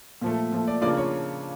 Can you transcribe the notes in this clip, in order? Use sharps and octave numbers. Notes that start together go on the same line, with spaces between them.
A#2 F3 A3
A#2 F3 A3
D5
C#3 F3 A#3 D4 F4 D5
C#5